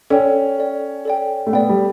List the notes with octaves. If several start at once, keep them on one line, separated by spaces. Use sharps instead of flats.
C#4 A4 D5 G5
A4 D5 G5
A4 D5 G5
A3
B3 A4 D5 G5
G3